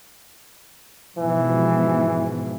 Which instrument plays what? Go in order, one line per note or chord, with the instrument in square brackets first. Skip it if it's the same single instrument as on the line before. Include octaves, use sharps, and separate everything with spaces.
[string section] G#2 B2 F3 [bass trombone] E3